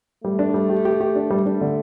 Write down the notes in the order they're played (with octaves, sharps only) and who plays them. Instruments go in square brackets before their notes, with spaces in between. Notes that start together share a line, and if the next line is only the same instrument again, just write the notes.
[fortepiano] G3 [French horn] A3
[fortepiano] D4
G3
G4
G4
G4
D4
G3
[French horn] A3 [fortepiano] D4
[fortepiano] D3